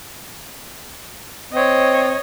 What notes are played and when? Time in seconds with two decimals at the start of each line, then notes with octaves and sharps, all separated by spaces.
1.53 C4 C#5 D#5